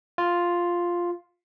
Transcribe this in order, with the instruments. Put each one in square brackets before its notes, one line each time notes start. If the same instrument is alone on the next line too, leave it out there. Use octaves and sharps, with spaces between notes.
[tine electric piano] F4